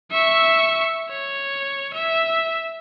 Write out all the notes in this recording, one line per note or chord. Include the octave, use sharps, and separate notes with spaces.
E5 C#6
C#5
E5